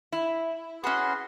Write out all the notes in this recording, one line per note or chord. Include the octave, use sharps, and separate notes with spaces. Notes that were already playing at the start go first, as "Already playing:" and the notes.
E4
C#4 F#4 G#4 B4 C6